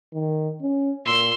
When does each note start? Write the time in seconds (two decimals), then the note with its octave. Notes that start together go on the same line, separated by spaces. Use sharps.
0.13 D#3
0.61 C#4
1.05 A#2 C6 E6